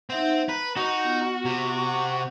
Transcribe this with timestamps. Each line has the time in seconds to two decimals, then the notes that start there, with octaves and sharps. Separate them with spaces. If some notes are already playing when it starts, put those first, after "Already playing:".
0.10 C4 D#4 C5 E5 F#5
0.49 B4 A#5
0.76 D#4 F#4
1.05 B3 F4
1.45 C3